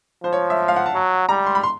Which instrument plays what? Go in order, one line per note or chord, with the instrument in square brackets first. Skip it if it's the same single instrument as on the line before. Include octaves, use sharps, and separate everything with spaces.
[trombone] F3 [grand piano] C5
[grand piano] C#5
E5
F5
F#5
A5
[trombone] F#3
[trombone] G3 [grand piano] A#5
[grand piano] C6
B5
C6